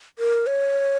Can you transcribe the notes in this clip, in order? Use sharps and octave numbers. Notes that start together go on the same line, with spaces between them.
A#4
C#5